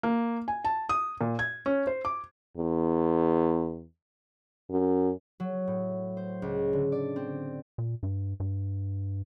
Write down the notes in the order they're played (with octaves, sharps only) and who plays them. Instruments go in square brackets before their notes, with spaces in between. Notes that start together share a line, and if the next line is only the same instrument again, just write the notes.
[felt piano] A#3
G#5
A5
D#6
A#2
G#6
C#4
C5
D6
[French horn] E2
F#2
[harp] F#3
A2
C5
C#2
D3
D5
C4
[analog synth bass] A#2
G2
G2